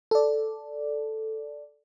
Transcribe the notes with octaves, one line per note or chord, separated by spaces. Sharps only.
A4 D5